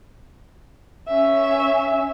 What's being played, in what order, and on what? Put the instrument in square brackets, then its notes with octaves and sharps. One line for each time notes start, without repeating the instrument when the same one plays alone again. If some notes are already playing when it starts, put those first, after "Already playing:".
[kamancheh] C#4 E5